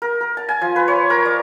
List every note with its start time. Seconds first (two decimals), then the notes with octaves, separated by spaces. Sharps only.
0.02 A#4
0.21 A#4
0.37 A5
0.49 G#5
0.61 F3
0.76 B4
0.88 C#5
1.10 A#4
1.25 D5